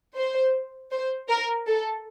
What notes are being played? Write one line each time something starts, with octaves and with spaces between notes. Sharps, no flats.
C5
C5
A#4
A4